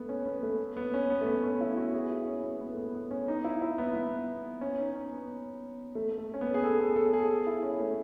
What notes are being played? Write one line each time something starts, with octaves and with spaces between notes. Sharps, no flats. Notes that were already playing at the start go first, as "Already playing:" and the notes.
Already playing: A3 B3
C#4
B3
A3
B3
C#4
B3
A3
B3
C#4
E4
F#4
G#4
E4
C#4
B3
B3
A3
B3
B3
C#4
D#4
E4
E4
B3
B3
C#4
D#4
C#4
B3
A3
A3
C#4
B3
G#4
A4
G#4
A4
G#4
G#4
E4
C#4
A3